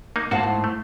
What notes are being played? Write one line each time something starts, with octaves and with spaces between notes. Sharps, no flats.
A#3 D#4
G#2 A#3 F#4 C5 F5 F#5 A5
A2
A3